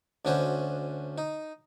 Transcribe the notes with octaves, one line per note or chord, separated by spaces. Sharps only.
D2 D3 C#4 F#4 C5
D#4